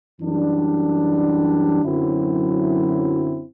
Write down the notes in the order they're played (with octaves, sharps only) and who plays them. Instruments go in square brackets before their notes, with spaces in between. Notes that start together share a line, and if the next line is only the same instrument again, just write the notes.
[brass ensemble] F#2 E3 G3 D4
F#2 D3 F#3 C4 E4